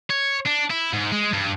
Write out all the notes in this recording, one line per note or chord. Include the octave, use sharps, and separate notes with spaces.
C#5
D4
E4
G#2
G#3
G2